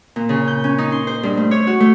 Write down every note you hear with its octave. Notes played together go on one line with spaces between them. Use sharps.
A#2
C#3
G6
C#4
D#4
C6
C5
G2
A3
C#5
F#4
A3